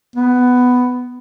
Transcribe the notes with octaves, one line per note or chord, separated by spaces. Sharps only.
B3